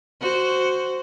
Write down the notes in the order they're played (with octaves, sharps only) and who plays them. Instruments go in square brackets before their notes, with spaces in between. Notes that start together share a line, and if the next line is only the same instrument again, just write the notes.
[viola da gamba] F#4 C5